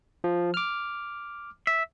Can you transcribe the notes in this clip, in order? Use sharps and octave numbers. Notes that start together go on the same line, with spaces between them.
F3
D6 F6
E5